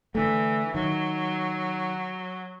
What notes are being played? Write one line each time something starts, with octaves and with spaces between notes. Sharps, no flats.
D3 E3 A3
D#3 F#3